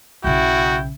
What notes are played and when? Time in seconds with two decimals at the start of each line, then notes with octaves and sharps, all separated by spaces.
0.24 B1 C#3 E4 F#4 G5